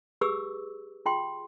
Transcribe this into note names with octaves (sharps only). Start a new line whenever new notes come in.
G4 G#4 B4 D6 E6
F4 G#4 G5 C6